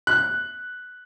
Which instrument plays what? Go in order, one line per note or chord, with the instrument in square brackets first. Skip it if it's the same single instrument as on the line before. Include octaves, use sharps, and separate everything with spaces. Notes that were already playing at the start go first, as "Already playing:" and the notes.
[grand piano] F#6